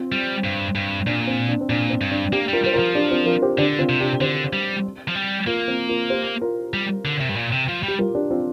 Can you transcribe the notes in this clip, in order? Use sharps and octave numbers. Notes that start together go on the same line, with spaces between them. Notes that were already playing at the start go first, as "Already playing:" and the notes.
Already playing: C4 F4
G3
G2
G2
A#2 D4
C4
D4
C4
A#2 D4
C4
G2
D4
A#3 D4 G4
G3 F4 A#4
G3 C5
F4 A#4
F3
D4 G4
C4 F4
F4 A#4
G4 C5
D3 D4 G4
C4 F4
C3
D4 G4
D3 G4 C5
G3
F3
G3
A#3 F4 A#4
C4 F4
F4 A#4
G4 C5
F4 A#4
G3
D3
C3
G2
A#2
C3
F3
G3
G4
F4 A#4
D4 G4
C4 F4